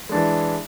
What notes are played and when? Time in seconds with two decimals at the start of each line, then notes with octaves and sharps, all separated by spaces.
0.09 G#3
0.12 D4
0.14 E3